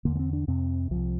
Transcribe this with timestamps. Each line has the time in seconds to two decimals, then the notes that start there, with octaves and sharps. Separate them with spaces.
0.05 E2 D3 A#3
0.15 A#3
0.19 C4
0.33 D4
0.48 F2 C3 C4
0.91 C2 C3 F3